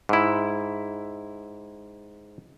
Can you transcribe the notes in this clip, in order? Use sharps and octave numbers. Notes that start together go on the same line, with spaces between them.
G#2 E4